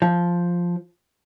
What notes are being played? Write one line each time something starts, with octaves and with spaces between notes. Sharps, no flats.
F3